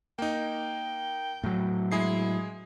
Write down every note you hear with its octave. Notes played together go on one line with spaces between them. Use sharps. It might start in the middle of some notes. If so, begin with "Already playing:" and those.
A#3 D#4 G5
A2 F#3
G#3 E4 G#4 C7